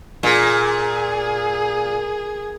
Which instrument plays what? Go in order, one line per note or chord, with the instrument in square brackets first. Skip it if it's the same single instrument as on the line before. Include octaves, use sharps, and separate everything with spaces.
[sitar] A#2 [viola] G#4